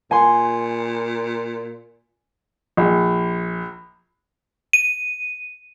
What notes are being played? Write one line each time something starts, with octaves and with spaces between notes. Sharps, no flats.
A#2 G#5 C6
A#1
D#7